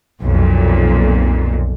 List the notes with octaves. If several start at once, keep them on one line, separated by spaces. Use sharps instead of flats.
B1 F2 A#2